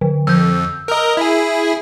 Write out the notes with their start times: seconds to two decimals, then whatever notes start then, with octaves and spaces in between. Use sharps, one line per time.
0.01 D3
0.27 F2 E6 G6
0.88 A#4 D#5
1.17 E4 G#4